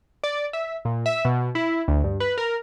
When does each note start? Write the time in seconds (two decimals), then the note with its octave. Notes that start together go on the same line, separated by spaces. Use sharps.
0.24 D5
0.53 E5
0.85 A#2
1.06 E5
1.25 B2
1.55 E4
1.88 D2
2.04 G2
2.20 B4
2.38 A#4